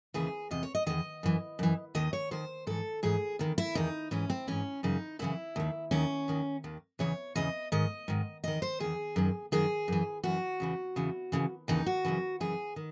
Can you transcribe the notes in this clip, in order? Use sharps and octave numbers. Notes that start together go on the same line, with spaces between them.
D#2 C#3 E3 G#4
E2 C3 D#5
C#5
D#5
E2 C3 D#3 D#5
F#2 E3
F#2 E3
D#2 D#3 D#5
C#5
D#2 D#3 C5
G#2 E3 A4
G#2 E3 G#4
E2 D#3
E4
E2 D#3 D#4
G#2 E3 C#4
C4
G#2 E3 C#4
F#2 C#3 E3 D#4
F#2 C#3 E3 E4
D#2 D#3
D#2 D#3 C#4
D#2 D#3
D#2 D#3
E2 C#3 E3 C#5
E2 C#3 E3 D#5
G#2 D#3 D#5
G#2 D#3
E2 D#3 D#5
C5
E2 D#3 G#4
F#2 D#3
F#2 D#3 G#4
F#2 E3
F#2 E3 F#4
E2 C#3 E3
E2 C#3 E3
D#2 C#3 E3
D#2 C#3 E3 D#4
F#4
F#2 C#3 E3
F#2 C#3 E3 G#4
D#3